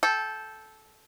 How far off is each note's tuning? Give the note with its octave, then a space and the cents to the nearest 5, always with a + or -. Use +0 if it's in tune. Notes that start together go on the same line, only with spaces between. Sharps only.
A4 -15 G5 +0